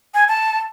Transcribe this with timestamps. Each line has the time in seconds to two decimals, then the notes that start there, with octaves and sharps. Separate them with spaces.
0.14 G#5
0.28 A5